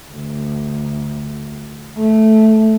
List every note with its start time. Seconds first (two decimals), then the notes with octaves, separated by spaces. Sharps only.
0.11 D2
1.98 A3